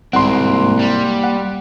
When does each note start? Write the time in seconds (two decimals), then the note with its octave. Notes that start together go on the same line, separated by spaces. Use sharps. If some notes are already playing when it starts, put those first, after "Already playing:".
0.13 C2 G#2 C4 F#5 C6
0.46 A#3
0.79 G3
1.24 F#5